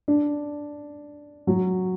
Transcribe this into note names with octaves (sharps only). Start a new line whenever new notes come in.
D4
F#3